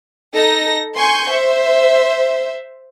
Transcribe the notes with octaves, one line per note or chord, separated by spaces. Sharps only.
D#4 A4 A#6
G#5 C6 C#6 G6
C5 E5